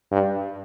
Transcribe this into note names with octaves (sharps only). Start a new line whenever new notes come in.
G2